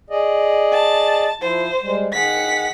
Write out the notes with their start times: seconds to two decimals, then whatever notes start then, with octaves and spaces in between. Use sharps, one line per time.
0.10 G#4 D5 D#5
0.73 A5
1.42 F3 E4 C5
1.82 G3 G#3
2.13 D#3 G#4 F#5 B6